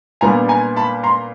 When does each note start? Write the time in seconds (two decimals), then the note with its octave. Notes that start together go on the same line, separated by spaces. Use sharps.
0.21 A#2 G3 B3 D4 G#5 A#5
0.48 G#5 A#5
0.76 A5 B5
1.03 A#5 C6